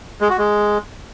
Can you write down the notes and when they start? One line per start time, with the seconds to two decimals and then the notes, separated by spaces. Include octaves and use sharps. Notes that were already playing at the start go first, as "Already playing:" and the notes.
0.21 G#3
0.30 F#4
0.39 G#3